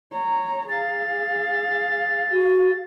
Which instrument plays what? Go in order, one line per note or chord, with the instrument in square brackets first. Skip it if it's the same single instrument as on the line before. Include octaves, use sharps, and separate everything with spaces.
[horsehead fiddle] C#5 A#5
[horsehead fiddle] G#4 F5 [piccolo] A6
[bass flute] F#4